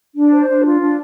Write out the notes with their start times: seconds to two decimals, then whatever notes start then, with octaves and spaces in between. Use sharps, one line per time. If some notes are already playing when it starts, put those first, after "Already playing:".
0.16 D4
0.32 C5
0.48 D4
0.65 F4
0.80 D4